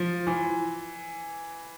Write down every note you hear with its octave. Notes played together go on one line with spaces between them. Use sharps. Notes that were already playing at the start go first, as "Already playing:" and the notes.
Already playing: F3
E3